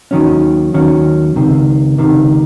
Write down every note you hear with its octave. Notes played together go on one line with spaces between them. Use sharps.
D#2 D#3 F#3 C#4
D#2 D#3 F#3 C#4
C#2 C3 D#3
C#2 C3 D#3